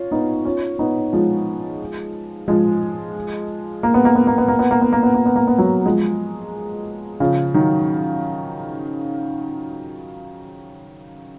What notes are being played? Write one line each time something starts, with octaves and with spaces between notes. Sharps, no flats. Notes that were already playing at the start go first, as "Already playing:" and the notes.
Already playing: C#4 F4
B3 D#4
C#4 F4
B3 D#4
F3 G#3
F3 G#3
A#3
B3
A#3
B3
A#3
B3
A#3
B3
A#3
B3
A#3
B3
A#3
B3
A#3
B3
F#3 A#3
F3 G#3
C#3 F3
D#3 F#3